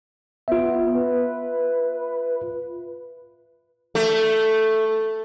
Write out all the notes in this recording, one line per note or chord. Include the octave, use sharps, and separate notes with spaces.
B3 F4 E5
B4
A3